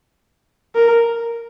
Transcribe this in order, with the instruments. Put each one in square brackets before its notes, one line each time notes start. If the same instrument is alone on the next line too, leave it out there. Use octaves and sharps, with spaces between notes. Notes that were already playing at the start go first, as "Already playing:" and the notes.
[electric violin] A#4